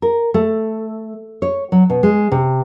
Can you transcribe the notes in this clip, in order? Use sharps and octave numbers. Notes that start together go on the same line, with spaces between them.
A#4
A3
C#5
F#3
B2
G#3
C3